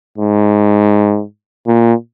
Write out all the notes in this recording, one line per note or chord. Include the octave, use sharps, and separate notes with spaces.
G#2
A#2